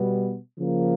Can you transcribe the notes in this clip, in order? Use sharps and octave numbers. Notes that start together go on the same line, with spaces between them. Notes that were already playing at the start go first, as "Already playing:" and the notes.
Already playing: B2 G3 B3
C#3 F3 A#3